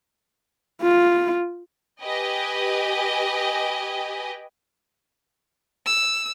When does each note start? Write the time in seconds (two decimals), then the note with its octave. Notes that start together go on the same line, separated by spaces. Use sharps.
0.82 F4
2.03 G4 B4 D#5 G5 G#5
5.86 E6